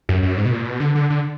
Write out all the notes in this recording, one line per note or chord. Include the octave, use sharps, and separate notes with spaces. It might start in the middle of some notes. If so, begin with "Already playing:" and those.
F#2
F#2
G#2
B2
A#2
B2
D3
D3
D3